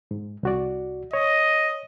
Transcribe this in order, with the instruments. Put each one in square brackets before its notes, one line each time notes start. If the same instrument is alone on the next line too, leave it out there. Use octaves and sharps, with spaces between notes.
[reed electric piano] G#2
C2 F#4 D5
[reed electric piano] C#5 [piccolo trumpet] D#5